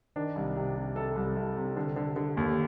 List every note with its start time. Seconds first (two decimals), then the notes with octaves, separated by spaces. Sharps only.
0.16 D#3 D4
0.36 C2
0.56 C3
0.76 C3
0.96 C3 A4
1.16 C2
1.36 C2
1.56 C3
1.76 D3
1.96 D3
2.16 D3
2.37 D#2